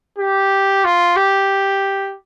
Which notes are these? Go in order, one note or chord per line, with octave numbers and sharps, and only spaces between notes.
G4
F4
G4